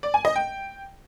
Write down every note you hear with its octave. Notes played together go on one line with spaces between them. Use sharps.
D5
G#5
D#5
G5